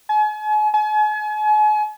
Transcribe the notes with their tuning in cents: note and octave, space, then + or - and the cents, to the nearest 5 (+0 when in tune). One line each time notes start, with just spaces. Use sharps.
G#5 +40
G#5 +40